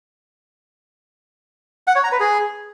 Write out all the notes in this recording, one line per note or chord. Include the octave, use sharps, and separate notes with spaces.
F#5
C#5
A#5
B4
G#4